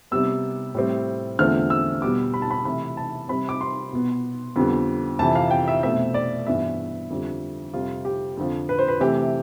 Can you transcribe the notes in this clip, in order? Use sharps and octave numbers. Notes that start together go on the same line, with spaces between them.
C3 G3 B3 E6
A2 G3 C4
E2 D3 F3 A3 C4 F6
E6
B2 G3 B3 D6
B5
A5
B5
C3 E3 A3 B5
A5
C3 G3 C4 B5
D6
C6
B2 B3
F2 D3 G3 B3
F2 C3 E3 A5
F5
G5
E5
B2 A3 C4 E5
D5
G2 E3 B3 E5
F2 D3 G3
F2 C3 G3 F4
G4
F2 D3 F3
B4
C5
B4
C3 E3 A3 C4 G4